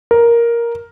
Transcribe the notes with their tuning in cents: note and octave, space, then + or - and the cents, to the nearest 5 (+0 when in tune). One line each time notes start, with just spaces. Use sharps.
A#4 +5